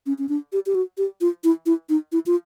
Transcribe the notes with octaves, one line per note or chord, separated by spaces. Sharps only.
C#4
C#4
D4
G4
G4
F#4
G4
F4
E4
E4
D#4
E4
F4